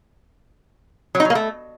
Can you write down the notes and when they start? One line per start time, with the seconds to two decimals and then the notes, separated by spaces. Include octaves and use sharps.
1.15 F#3
1.20 D#4
1.25 F#3
1.30 A#3
1.35 A3